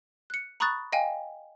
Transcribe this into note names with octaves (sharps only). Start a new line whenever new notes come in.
F#6 C#7
A#5 B5 C#6 D#6 F#6 A6
D#5 F5 G5 G#5